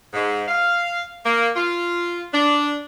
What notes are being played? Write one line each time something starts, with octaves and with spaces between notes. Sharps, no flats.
G#2
F5
A#3
F4
D4